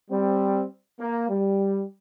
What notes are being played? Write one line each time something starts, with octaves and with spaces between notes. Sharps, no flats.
G3 C4
A#3
G3